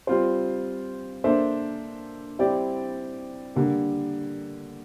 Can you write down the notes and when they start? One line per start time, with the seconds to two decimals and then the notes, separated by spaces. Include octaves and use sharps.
0.07 G3 C4 F4 C5
1.24 A#3 D4 A4 C5 E5
2.39 G3 C4 E4 G4 D5
3.56 D3 G3 A#3